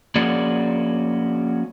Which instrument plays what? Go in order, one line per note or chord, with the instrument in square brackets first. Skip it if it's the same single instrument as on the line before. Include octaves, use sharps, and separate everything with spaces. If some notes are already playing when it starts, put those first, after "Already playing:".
[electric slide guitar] F3 A#3 C#4 F#4 G#4 D5